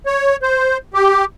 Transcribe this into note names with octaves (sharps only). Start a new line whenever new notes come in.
C#5
C5
G4